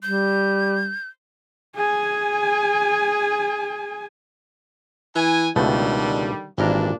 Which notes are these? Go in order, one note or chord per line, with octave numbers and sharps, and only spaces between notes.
G3 G6
G#4 G#5
E3 G#5
C#2 B2 D3 D#3 G3 A3
G#1 G2 A#2 E3 D4 A#4